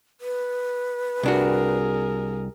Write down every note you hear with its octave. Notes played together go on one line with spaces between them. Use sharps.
B4
C2 D4 F#4 G#4 A#4